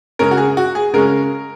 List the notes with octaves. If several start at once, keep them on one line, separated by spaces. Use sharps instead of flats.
C#3 G#3 C#4 A#4
F#4
G#4
F#4
G#4
C#3 G#3 C#4 A#4